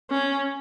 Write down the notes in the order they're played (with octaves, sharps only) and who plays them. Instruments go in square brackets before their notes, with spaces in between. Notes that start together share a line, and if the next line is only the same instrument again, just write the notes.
[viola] C#4